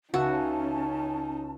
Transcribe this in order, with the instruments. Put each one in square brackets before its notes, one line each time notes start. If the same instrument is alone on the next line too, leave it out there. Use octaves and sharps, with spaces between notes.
[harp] C#2 E5 [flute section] C#4 A5 [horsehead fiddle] D#4 [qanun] F#4